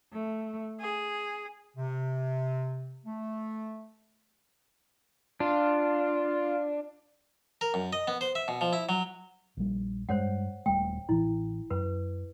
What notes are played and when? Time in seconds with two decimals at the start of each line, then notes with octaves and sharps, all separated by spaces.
0.13 A3
0.80 G#4
1.77 C3
3.06 A3
5.40 D4 F4
7.61 A#4
7.74 F#2
7.93 D#5
8.08 B3
8.21 C5
8.35 E5
8.48 B2
8.61 F3
8.73 E4
8.89 F#3
9.57 A#1 G3
10.09 G2 G#3 C5 C#5 F#5
10.66 D#1 G3 A3 G5
11.09 A1 E3 E4
11.70 F#2 B4